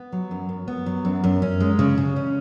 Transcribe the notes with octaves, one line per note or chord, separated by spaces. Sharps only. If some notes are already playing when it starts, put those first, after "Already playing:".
Already playing: B3
F#3
F#2
F#2
B3
F#3
F#2
F#2
C#4
G#3
C#3
C#3
C#4